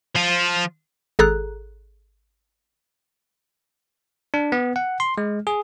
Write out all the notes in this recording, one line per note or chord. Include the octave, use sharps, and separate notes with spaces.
F3 F4
G#1 G#4 A4 A#5 F#6
D4
B3
F#5
C6
G#3
G#4